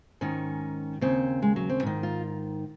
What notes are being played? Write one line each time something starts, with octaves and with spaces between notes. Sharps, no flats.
G#2 D#3 C#4
D#2 C#3 C4
G#3
F#3
C4
G#2 D#3
F4